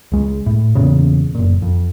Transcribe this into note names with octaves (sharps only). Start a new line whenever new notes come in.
C#2 G#3
A2
E2 A#2 C#3
F#1 A#2
F2